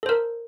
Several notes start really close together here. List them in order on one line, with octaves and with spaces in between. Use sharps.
A4 C5 A#4